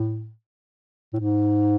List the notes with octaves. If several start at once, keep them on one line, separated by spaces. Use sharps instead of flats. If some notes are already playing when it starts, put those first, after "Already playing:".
Already playing: A2
A2
G#2